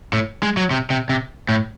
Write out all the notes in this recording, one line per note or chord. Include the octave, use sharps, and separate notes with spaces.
A2
G#3
F#3
C3
C3
C3
A2